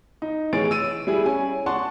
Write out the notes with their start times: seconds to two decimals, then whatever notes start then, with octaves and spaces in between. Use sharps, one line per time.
0.22 D#4
0.53 A1 E3 G#4 C#5 A6 D7
0.71 E6 D#7
1.07 G3 E4 G#4
1.26 C#4 G#5
1.66 D5 F#5 A5 C6 C#6